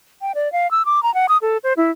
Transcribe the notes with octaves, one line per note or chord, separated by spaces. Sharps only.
G5
D5
F5
E6
D6
A#5
F#5
D#6
A4
C5
E4